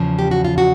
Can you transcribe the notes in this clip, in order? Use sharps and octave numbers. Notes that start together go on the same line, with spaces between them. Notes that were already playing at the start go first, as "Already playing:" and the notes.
Already playing: E2 C#3 F3
G4
F#4
F4
F#4